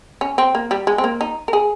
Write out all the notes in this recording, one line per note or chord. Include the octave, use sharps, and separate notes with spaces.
C#4
C4
A#3
G3
G#3
C4
A#3
D#4
A#4
G#4